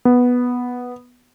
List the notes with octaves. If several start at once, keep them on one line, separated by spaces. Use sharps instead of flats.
B3